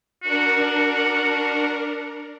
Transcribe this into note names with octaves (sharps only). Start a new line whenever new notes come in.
D4 F#4 A#4